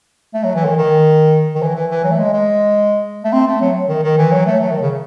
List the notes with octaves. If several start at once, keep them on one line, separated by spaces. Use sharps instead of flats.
A3
F#3
E3
D#3
D#3
D#3
E3
E3
E3
F#3
A3
G#3
G#3
A3
C4
A3
F#3
D#3
D#3
E3
F#3
A3
F#3
D#3
C#3